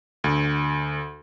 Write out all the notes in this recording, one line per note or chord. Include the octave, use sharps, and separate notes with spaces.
D2